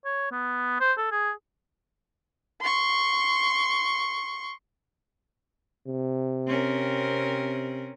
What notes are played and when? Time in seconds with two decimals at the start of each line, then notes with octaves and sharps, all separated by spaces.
0.05 C#5
0.31 B3
0.80 C5
0.97 A4
1.12 G#4
2.62 C6 C#6
5.87 C3
6.47 C4 C#4 A#4